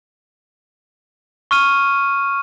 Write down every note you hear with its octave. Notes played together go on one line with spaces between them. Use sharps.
C#6 F6 D#7